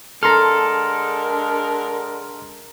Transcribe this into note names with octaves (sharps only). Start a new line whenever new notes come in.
D3 G#3 A4 A#4 A#5 C6 F6